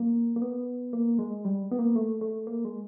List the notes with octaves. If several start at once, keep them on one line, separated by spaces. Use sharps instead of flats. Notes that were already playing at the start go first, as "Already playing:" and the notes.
Already playing: A#3
A#3
B3
A#3
G#3
G3
B3
A#3
A3
A3
A#3
G#3